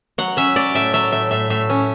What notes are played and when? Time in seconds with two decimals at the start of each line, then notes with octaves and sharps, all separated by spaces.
0.18 F#3 F#5
0.37 C#4 E5
0.56 F#3 D5
0.75 A2 E5
0.93 F#3 E5
1.12 A2 E5
1.31 A2 E5
1.50 A2 E5
1.70 C#4